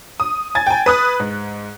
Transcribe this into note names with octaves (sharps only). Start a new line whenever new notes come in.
D#6
G#5 G#6 A6
G5 G#5
B4 D#6 F#6
G#2